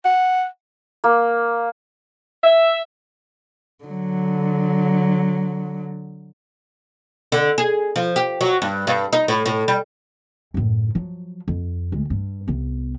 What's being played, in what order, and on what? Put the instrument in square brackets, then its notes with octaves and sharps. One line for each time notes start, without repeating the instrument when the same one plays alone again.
[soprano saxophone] F#5
[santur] A#3
[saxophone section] E5
[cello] D3 F#3
[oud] D3
G#4
F3
G4
F#3
G2
G2
D#4
A2
A2
G3
[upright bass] F#2 A2
F3 F#3
F2
D2 G#3
G2
C2 B3